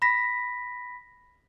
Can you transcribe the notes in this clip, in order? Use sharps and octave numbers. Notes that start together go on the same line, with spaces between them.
B5 A#6 B6